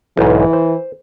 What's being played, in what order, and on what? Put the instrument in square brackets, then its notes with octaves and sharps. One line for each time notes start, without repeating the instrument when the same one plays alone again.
[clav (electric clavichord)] B1 G#2 [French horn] E3
[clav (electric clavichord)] C5